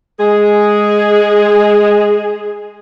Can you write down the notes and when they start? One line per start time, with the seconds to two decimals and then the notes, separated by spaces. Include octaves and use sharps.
0.19 G#3 G#4